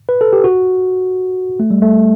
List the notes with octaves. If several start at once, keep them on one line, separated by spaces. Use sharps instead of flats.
B4
A4
G4
F#4
A3
G3
A3